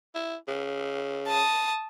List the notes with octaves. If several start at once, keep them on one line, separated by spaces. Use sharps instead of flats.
E4
C#3
A5 D#6